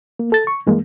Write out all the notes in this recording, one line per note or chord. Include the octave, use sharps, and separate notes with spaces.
A#3
A4 A6
C#6
G2 E3 G#3 A#3